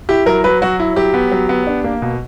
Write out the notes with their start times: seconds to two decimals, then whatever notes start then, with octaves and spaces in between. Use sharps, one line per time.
0.09 E4 G4
0.26 F#3 A#4
0.44 F#3 B4
0.62 F#3 F#4
0.80 E4
0.96 F#3 G4
1.14 B3
1.31 F#3
1.49 B3
1.67 D4
1.84 A#3
2.02 B2